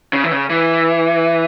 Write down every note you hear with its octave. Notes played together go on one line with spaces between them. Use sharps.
C#3
E3
C#3
E3